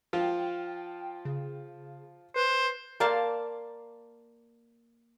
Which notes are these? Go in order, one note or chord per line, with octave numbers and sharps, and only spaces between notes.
F3 F4 G5
C#3
B4 C5
A#3 C5 D5 F5 A5